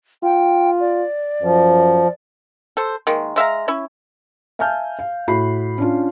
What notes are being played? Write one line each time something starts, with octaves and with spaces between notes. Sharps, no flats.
F4 G5
D5
F#2 F3
A4 C5
D#3 G#3 A#3
G#3 E5 F5 A#5
C#4 E4
E5 F5 G#5 A5 F6 G6
F5
A2 F#4 B5 C7
C#4 D4 F4